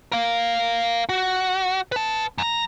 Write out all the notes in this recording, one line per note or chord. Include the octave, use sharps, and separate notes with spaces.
A#4 F5
F#4
B4 A5
F#2 A#5